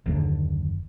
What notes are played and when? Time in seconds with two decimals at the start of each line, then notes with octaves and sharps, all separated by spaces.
0.06 F#1 D#2 D3